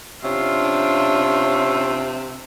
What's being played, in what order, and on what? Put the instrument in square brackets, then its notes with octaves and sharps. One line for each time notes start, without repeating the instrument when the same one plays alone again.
[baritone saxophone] C3 [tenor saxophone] C#4 [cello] D4 F4 [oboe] E5